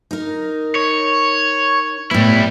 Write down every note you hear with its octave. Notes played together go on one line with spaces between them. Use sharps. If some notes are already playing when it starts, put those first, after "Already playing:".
D#4 A#4
C#5
A2 G3 B3 E4